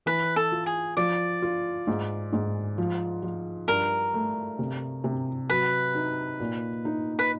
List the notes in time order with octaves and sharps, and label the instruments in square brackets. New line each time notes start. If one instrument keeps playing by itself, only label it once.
[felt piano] E3 [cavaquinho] B4
[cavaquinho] A4
[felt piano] F4
[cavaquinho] G#4
[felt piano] F3 [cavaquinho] D5
[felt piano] F4
G#2
G#2
F3
F3
[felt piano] G2 [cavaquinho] A#4
[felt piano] A3
C3
C3
[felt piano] F#3 [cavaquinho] B4
[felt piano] D#4
A#2
D#4
[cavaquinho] B4